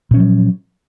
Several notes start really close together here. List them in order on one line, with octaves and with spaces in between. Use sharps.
A#2 C#4 F3 F#3